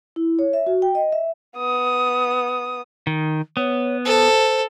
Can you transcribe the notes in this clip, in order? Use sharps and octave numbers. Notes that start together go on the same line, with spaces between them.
E4
C#5
E5
F#4
G5
D#5
E5
B3 D#6
D#3
B3 C#5
A4 C5